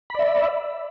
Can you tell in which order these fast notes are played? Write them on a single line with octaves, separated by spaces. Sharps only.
B5 D5 E5